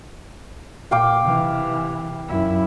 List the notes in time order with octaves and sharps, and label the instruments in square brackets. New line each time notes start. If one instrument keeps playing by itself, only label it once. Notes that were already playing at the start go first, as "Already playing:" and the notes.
[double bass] A#2 [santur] F5 G5 D6
[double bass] C3 E3
F#2 E4